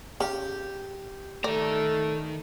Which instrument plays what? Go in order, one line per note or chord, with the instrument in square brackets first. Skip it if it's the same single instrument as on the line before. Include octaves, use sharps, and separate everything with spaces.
[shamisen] C#3 [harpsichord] G4
[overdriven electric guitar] D#3 A#5 [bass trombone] A3 [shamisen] D5